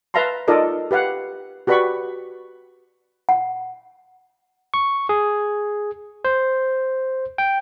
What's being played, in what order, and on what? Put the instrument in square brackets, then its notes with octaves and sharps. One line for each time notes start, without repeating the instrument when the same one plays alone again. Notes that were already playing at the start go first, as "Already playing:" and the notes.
[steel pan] B4 E5 F5 A5 A#5 C6
D#4 F4 A4 A#4 D5 D#5
G4 B4 F5 F#5
F#4 G4 B4 D5 B5 C#6
[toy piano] F#5
[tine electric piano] C#6
G#4
C5
G5